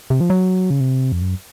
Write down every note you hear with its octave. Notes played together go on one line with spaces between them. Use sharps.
C3
F3
F#3
C#3
C3
F2
F#2